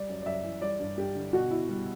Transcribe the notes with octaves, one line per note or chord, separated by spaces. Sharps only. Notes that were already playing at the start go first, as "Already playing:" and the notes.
Already playing: G3 D5
F#2
D5
F#2 E5
E3
G3 D5
G2
G2 G4
D3
B2 F#4
B2 E4
G3